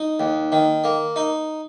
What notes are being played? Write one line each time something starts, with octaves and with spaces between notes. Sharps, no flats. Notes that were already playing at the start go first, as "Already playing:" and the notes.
Already playing: D#4
D#2
D#3
A#3
D#4